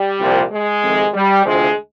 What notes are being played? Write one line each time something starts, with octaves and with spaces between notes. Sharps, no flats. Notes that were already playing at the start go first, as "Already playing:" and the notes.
Already playing: G3
C2 A#2 F3
G#3
F2 C3 D#3
G3
D2 C3 F3 G#3